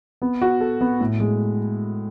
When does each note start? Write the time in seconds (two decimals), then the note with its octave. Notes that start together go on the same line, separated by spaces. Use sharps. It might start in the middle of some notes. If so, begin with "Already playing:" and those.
0.22 B3
0.41 F#4
0.61 A4
0.81 B3
1.01 A2
1.20 G#3